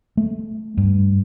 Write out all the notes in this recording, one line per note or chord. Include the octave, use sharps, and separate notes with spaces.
A3
G2